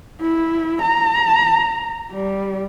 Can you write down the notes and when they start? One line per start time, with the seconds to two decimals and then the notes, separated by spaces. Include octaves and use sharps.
0.21 E4
0.82 A#5
2.12 G3